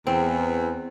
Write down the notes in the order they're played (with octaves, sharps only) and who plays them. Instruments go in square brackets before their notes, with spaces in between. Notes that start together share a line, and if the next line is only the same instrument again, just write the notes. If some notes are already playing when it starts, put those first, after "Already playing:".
[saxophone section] E2 [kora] C4